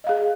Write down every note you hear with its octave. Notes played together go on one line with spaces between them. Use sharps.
G#4 D#5 F5